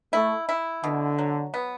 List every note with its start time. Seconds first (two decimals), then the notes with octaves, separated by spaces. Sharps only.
0.13 A3 E4
0.49 E4
0.83 B2 D3
1.18 F#3
1.54 B3